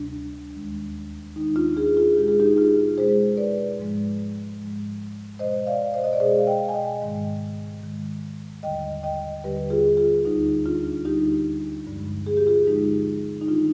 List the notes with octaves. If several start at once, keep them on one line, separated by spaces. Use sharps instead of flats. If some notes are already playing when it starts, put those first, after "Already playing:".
Already playing: D2 C3 G3 D4
D#2 D#3 G#3
D#2 D#3 G#3 D#4
D4 F4
F4 G#4
F4 G#4
B2 G#3 G4
G#4
D#4 G4
F4 G#4
B2 G#3 G#4 C5
B4 D5
G#2 F3 G#3
G#2 F3 G#3
B2 G#3 C5 D#5
D5 F5
C5 D#5
D#5
D5
B2 G#3 G#4 C5
F5
D#5 G5
G#5
D#5 G5
G#2 D#3 G#3
G#2 D#3 G#3
D#2 D3 G3 D#5 G5
D#5 G5
D#2 D3 G3 G4 B4
F4 G#4
F4 G#4
D2 D3 G3 D#4
D4 F4
D2 D3 G3 D#4 G4
G2 D3 F3 G#3
G#4
G4
F4 G#4
G2 D3 F3 G#3 D#4 G4
D#4
D#3 G3 D4 F4